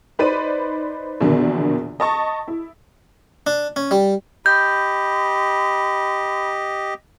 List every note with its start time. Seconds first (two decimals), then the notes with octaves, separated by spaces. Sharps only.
0.19 D#4 B4 C5 D5 B5 D#7
1.20 A#1 E2 B2 D3 D#3
2.00 D#5 A5 C#6
2.48 E4
3.47 D4
3.76 C#4
3.91 G3
4.46 G4 D#5 B5 G6